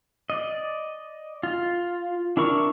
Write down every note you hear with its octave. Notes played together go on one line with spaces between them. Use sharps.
D5 D#5
F4
D4 E4 A#4 C#6